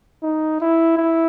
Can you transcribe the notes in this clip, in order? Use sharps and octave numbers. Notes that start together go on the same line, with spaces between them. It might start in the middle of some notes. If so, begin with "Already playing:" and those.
D#4
E4
E4